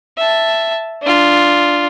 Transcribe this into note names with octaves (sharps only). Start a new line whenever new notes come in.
E5 A5
D4 F4